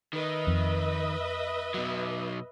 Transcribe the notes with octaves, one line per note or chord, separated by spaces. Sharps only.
D#3 B4 D#5 E5
F2
B2 F#3